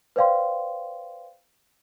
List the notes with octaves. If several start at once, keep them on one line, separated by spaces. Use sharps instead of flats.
B4 C5 D5 F5 G5 C6